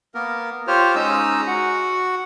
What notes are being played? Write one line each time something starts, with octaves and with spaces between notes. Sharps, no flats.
A#3 B3 A#4
F4 G4 C5 C#5 F6
G#3 C#4 D#4 A#5 D#6 E6
F#4 F#5